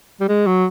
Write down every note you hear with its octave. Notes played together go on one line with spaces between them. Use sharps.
G3
G#3
F#3